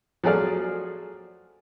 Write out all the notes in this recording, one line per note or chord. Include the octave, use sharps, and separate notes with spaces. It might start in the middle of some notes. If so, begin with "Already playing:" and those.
F3 F#3 A3 G#4 D5 F6